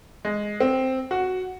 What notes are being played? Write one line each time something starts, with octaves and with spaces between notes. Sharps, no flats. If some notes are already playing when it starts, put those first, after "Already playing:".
G#3
C4
F#4